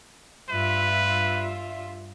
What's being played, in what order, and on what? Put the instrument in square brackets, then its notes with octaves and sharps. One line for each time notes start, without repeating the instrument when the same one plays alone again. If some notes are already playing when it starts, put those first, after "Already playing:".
[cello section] G2 F4 E5 [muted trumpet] B4